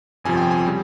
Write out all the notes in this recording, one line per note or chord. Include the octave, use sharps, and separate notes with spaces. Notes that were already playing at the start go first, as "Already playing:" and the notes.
G1 F2 C3 F3 G#5
G5
G#5
C#3 G3